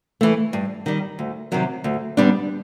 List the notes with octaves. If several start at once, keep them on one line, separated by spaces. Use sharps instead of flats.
E3 A3
G2
D#3 G3
D2
C3 D#3 F#3
D2
D3 G3 B3 D4